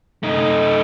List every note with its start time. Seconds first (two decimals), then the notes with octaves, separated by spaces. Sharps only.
0.23 A3 D#4